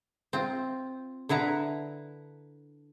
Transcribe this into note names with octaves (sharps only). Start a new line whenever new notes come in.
C4 F4
D3 E4 B4 A#5